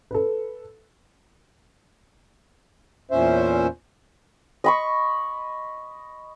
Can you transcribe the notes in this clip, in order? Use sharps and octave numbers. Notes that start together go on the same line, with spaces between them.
A4 B4
E2 A#2 C#4 C5 E5
D#5 B5 C#6